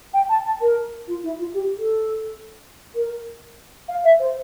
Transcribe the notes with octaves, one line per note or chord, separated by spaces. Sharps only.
G5
A5
A5
A#4
F4
E4
F4
G4
A4
A#4
F5
E5
C5